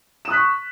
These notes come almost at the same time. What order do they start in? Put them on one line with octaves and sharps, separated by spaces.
E7 D#6 F#6 B6 C#6